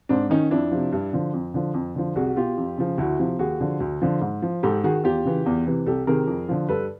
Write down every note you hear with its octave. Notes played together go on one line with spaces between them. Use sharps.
G#2 C4 D4
D#3 C#4 D#4
F2 D4 E4
C3 F3
G2
D3 F3
F2
D3 F3
F2
D3 F3
C2 F#4 G#4
F#4
B2 F4 G4
F2
C#3 F3
D2 E4 F#4
C3 F3
D#2 F#4 G#4
D3 F3
D2
D3 F3
G#2
F3
G#2 G4 A4
D#3 F#4 G#4
E2 F4 G4
C#3 E3
E2
C3 E3
C2 G4 A4
C3 D#3 G#4 A#4
F2
D3 F3
G2 A4 B4